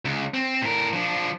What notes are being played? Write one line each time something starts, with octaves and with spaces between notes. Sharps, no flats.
C#2
C4
A2 A#4
F3 D4